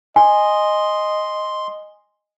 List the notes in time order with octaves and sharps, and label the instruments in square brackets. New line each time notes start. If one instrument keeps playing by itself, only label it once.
[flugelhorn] D#5 [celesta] G#5 [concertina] C6